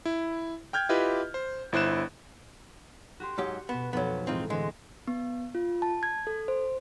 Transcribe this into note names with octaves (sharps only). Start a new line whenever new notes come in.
E4
G5 F6 G6 G#6
E4 F4 G4 B4 D#5
C5
G1 E4 C5 F#6 E7
F#4 G4 C6
G#2 F#3 G4 C#7
B2 B3 B4 E7
F1 F#3 B3
A2 E3 G#3 C4 D#4 F4
D3 E3 G#3 C4
B3
F4
A5
G#6
A4
C5